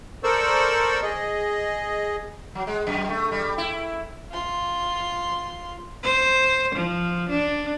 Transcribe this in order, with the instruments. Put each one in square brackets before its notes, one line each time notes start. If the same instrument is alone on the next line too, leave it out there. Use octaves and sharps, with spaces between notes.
[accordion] A4 A#4 C5 D5 C#6 E6
G#4 D#5
[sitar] F#3
G#3
F#2
A3
G3
E4
[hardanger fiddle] F4 C6
[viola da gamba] C5
F3
D4